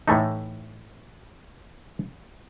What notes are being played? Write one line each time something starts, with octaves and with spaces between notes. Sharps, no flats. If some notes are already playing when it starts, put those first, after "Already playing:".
A2 E3 A3 D#4